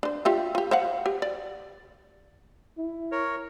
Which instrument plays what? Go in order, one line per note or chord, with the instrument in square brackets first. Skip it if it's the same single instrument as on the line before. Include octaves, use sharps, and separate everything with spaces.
[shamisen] D4 C5
F4 G4 E5
F4 G4
C5 F5 F#5
G4
D5
[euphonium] E4
[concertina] A#4 C#5